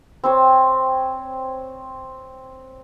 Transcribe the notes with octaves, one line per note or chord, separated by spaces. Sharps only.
C4 C5 C#5